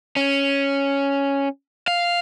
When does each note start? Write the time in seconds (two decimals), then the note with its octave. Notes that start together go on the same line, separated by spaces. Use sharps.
0.16 C#4
1.88 F5